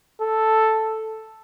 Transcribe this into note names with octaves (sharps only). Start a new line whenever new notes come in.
A4